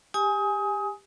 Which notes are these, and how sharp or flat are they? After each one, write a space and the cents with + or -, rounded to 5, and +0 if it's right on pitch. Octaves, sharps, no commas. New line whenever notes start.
G4 +20 G#5 +0 D#6 +25